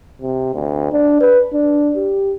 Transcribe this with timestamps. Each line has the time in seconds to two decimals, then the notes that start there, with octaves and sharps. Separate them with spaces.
0.22 C3
0.54 D2
0.92 D4
1.21 B4
1.53 D4
1.96 G4